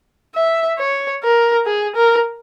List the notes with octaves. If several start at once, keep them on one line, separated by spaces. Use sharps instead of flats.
E5
C#5
A#4
G#4
A#4